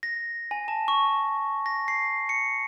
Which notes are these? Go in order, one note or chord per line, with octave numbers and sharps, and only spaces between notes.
A#6
G#5
A5
C#6
A#6
C7
C#7